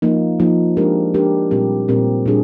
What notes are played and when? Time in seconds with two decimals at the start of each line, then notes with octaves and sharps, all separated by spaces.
0.02 F3 A#3 D#4
0.40 F3 A#3 D#4
0.77 G#3 D4 G4 A#4
1.14 G#3 D4 G4 A#4
1.51 A#2 G3 C4 G4 A#4
1.88 A#2 G3 C4 G4 A#4
2.26 A#2 G3 D4 G#4